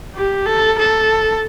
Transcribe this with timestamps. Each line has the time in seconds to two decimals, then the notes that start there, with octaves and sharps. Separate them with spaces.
0.16 G4
0.46 A4
0.79 A4